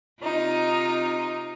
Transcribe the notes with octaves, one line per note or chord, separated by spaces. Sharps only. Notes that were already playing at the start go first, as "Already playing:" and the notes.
C3 D#4 F4